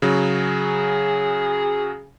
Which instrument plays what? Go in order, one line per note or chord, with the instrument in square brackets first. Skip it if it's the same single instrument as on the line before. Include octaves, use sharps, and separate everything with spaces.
[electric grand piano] C#3 F#3 [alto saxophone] G#4